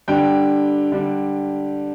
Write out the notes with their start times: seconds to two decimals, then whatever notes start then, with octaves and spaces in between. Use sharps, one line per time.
0.08 D3 G3 G5
0.92 D3 G3